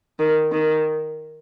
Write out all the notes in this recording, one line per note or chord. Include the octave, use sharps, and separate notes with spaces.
D#3
D#3